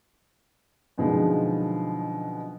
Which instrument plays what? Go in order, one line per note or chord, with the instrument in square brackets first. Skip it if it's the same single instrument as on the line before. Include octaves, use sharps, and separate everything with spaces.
[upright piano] F#2 B2 D3 F3 G#3 D#4